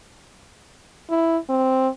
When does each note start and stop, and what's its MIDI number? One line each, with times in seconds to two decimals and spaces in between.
1.10 1.38 64
1.49 1.88 60